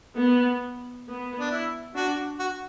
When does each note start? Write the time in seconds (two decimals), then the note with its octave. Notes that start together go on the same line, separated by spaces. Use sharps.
0.18 B3
1.07 B3
1.40 D4
1.51 E4
1.95 D4 F#4
2.39 F#4